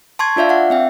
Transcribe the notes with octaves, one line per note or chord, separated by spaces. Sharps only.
A5 C6 C#6 G#6
D4 F4 D5 E5 F5
F5 F#5
C4 E5 G5